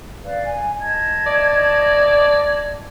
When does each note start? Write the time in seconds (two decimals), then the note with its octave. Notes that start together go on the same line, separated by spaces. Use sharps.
0.24 B4 D5 F5
0.46 G#5
0.79 D#5 A5 G#6
1.26 D5